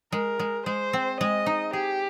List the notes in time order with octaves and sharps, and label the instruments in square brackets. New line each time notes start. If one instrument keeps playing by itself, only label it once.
[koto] G#3 [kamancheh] A#4
[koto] G#3
[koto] G#3 [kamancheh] C5
[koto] C4
[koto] G#3 [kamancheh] D#5
[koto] D#4
[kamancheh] G4 [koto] G#4